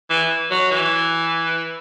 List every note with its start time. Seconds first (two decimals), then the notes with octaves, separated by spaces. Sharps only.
0.10 E3
0.51 F#3
0.71 E3